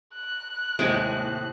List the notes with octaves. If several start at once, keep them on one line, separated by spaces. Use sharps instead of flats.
F#6
D#2 A2 C3 G#3 G5 G#5